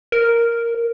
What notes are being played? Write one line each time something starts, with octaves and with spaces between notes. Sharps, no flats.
A#4